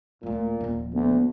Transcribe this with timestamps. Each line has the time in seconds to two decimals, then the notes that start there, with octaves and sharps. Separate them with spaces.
0.23 D1 A#2 A3
0.60 D#1 F3
0.94 D2 B3